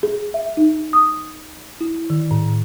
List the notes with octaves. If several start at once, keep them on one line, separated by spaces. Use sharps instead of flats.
G#4
E5
D#4
D#6
E4
D#3
A2